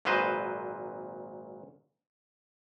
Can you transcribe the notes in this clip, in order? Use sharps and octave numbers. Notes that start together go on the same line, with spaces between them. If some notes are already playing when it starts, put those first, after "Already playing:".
G#1 A#2 F#3 B4 C5 D#5